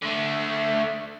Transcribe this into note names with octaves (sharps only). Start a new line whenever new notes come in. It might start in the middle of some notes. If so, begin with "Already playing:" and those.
D3 A3